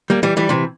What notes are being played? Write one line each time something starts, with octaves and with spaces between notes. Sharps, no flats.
G3 A#3
E3 G3
E3 G3
C3 E3